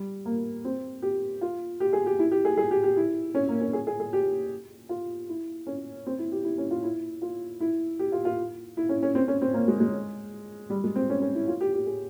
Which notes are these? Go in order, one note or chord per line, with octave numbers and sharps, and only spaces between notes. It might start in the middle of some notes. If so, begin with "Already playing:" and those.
Already playing: G3
A#3
C4
G4
F4
G4
G#4
G4
E4
G4
G#4
G#4
G4
G4
E4
C#4
A#3
C#4
G#4
G#4
G#4
G4
F4
E4
C#4
C4
E4
G4
E4
C#4
F4
E4
F4
E4
G4
F4
F4
E4
C#4
C#4
C4
C#4
C4
A#3
G#3
G#3
G3
G#3
C4
C#4
C#4
E4
F4
G4
G4
G#4